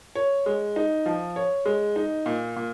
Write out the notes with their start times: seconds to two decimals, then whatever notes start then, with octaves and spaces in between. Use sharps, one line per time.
0.15 C#5
0.46 G#3
0.76 D#4
1.06 F3
1.36 C#5
1.65 G#3
1.96 D#4
2.26 A#2
2.56 A#2